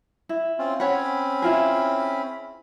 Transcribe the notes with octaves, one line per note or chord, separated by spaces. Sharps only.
E4
C4 C#4 F4
C4 C#4 C#5 F#5 B5
E4 F4 G#4